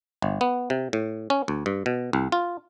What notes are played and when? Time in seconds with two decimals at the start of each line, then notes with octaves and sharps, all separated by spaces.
0.22 G1
0.41 B3
0.70 C3
0.93 A2
1.30 C#4
1.48 D2
1.66 G2
1.86 B2
2.13 C2
2.32 F4